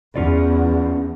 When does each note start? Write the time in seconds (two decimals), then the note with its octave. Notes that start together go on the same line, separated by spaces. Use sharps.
0.16 E2 C#4 F4 D5